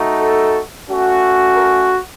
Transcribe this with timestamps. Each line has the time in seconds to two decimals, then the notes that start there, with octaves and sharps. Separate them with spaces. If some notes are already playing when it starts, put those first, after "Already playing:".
Already playing: A3 D#4 F#4
0.18 A4
0.87 A3 C#4 F#4
1.56 A#4